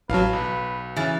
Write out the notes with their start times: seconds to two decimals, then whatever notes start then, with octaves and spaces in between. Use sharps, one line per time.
0.10 A1 F#3 B4 F5 A5
0.33 B1
0.96 C#3 E3 A6